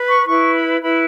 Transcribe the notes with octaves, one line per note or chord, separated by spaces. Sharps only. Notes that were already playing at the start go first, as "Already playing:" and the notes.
Already playing: B4
C#6
E4 B4 C#6
B5
E4 B4 B5